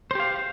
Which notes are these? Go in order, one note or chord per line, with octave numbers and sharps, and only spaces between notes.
G4 C5 F5